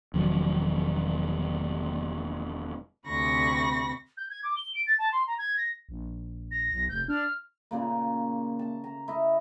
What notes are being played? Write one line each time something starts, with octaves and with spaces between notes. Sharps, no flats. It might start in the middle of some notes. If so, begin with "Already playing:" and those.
E1 D#3 F3 F#3
D2 C3 B5 C#6 A#6
G6
G#6
D6
G7
D7
A6
A5
C6
A#5
G#6
A#6
A#1
A#6
B1
F1 G6
D4 F6
A#2 C#3 A#3
A5
A#5
E4 D#5